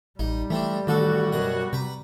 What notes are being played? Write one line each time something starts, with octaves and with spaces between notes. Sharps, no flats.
A1 G3 D#4
E3 A3 C4 D4
A1 D#3 F#4 A4 A5
F#2 B2 D#6
C3 B4 A#5